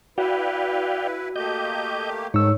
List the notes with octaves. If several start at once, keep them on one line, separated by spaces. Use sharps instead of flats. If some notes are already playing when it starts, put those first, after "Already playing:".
E4 F#4 B4 D5 F5 G5
A3 A#3 G4 D#5 G6
G#2 D#3 A3 C#5 E6